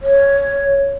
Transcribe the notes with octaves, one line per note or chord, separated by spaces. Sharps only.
C#5